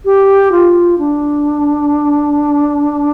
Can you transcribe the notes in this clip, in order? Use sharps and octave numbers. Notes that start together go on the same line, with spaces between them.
G4
F4
D4